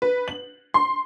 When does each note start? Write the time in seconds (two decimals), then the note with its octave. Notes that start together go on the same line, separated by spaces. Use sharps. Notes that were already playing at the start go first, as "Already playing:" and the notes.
0.02 B4
0.28 F#7
0.74 C6